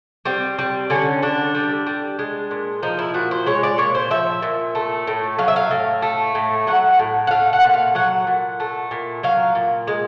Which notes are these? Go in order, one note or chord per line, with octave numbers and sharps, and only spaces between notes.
G3 C4
G3
D3 C#4
D3 D4
G3
G3
G#3
A#2
F3 D#4
E4
A#2 F#4
C5
G#3 C#5
D5
A#2 C#5
C5
F3 E5
A#2
A3
A2
F#3 F5
E5
F5
A2
A3
A2
F#3 F#5
A2
F#5
A3 F5
F#5
A#2
F5
F#3 F#5
A#2
A3
A#2
F#3 F5
A#2
G#3